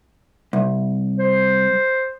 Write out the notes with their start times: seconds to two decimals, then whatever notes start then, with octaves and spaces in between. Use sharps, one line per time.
0.53 C2
1.19 C5